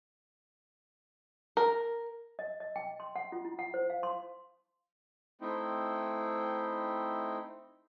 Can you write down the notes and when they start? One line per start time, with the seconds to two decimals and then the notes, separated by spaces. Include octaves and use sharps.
1.57 A#4
2.39 D#5
2.60 D#5
2.76 G5
3.00 C6
3.16 F#5
3.32 F4
3.45 E4
3.59 F#5
3.74 C5
3.90 F5
4.03 C6
5.41 A3 C4 D#4 E4 G5